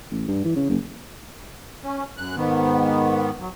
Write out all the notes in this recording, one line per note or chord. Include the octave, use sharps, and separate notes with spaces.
A1
G2
E3
C#3
F#1
C#4
F#2 F#6
G#2 D#3 B3
F#3